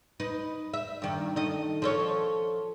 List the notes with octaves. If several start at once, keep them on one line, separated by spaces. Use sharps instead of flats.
D#4 B4
E5
G2 D#3
D#3 A4 D#5
F3 A4 C#5